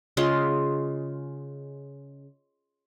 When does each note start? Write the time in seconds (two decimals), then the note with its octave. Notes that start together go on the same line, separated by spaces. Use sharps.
0.17 C#3 G#3 F4 C6